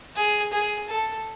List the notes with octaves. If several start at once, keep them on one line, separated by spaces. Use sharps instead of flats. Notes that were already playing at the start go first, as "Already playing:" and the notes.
G#4
G#4
A4